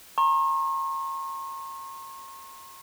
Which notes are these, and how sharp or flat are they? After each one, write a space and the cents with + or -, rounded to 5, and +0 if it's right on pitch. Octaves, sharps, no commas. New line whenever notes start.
A#5 -20 C#6 -45